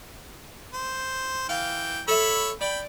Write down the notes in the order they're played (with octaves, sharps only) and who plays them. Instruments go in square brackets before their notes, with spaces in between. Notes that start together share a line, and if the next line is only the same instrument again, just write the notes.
[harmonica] C5
[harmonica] E3 G5 [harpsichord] F5
[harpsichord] A4 E5 [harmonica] C#5 B5 E6
[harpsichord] D5 [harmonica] G5 B5